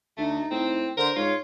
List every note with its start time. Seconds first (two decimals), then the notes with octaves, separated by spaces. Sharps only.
0.17 D2 A3 D#4
0.51 A2 C4
0.97 D3 A#4 C5
1.16 G#2 F4 C#5